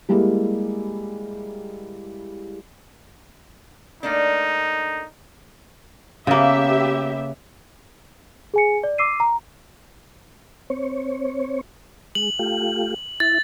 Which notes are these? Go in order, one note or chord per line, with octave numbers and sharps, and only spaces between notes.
G3 G#3 A#3 E4 G4 G#4
A3 A#3 D4 D#4
C#3 A#3 B3 G4 E5
G#4 G#5 C#7
D5
D6 E6 C7 D#7
A#5
C4 C#5
G#3 F#7
A3 F4 G4
E4 A6